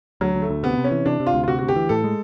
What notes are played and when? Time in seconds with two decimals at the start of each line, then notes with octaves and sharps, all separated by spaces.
0.21 D2 F#3
0.35 D2
0.42 A3
0.49 D2
0.63 C3 B3
0.78 C3
0.84 C#4
0.91 E3
1.06 C3 D4
1.20 C3
1.26 F4
1.34 D2
1.44 F4
1.48 C3 F#4
1.59 D2 F#4
1.68 G4
1.76 E3
1.89 A2 A4
2.04 G#3